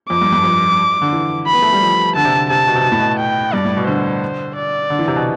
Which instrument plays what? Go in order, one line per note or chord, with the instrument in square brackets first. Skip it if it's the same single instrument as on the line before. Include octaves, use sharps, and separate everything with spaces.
[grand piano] F2 [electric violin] D6
[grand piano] G2
G2
F2
D3
E3
[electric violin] B5
[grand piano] B3
A3
G3
F3
[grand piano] D3 [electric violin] A5
[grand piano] C3
D3
[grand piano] C3 [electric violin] A5
[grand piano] B2
C3
B2
A2
B2
[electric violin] G5
[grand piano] G2 [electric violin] D5
[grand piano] A2
B2
[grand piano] D3 [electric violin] C5
[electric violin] D5
[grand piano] D3
E3
C3
B2